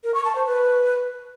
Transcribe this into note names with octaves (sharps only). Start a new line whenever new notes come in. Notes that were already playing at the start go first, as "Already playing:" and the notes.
A#4
C#6
A5
C5
B4